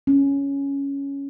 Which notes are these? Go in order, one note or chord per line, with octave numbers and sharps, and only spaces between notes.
C#4